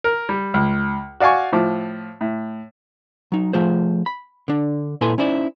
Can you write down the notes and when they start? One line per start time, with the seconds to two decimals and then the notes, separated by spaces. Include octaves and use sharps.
0.04 A#4
0.29 G3
0.54 C#2
1.20 F#4 D5 F5 G#5 C#6
1.52 A2 F3 D6
2.21 A2
3.32 F#3 D#4
3.53 F3 A3 F4 G#4 C5
4.06 B5
4.48 D3 D4
5.01 A#2 E4 A4 B4 G#5 C6
5.18 C#4 D#4 E4 C5 D5